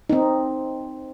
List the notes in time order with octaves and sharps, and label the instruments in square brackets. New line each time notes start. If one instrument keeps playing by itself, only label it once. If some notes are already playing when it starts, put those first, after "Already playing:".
[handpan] C4 D#4